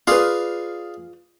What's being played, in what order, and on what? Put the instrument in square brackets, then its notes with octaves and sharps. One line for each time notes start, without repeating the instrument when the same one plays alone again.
[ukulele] F4 B4 [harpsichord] G#4 D5 F5